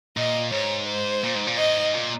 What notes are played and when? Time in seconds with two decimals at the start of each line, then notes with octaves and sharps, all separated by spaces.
0.17 A#2 D#5
0.52 G#2 C#5
0.88 C5
1.23 A#2
1.35 G#2
1.47 A#2
1.58 G#2 D#5
1.94 A#2